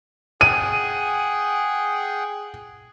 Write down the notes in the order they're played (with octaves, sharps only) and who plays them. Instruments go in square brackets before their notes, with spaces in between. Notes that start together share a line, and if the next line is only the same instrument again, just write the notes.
[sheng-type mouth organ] G#4 F#5 G5 [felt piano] D#7